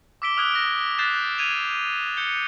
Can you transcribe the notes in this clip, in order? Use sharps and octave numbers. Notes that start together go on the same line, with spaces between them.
D6 E6 B6 D7 G7
D#6 F6 F#6 G#6 D7 G7
A#6
F#6 G6 A6 B6 C7 E7
G#6 D#7 F7
G6 C#7 G7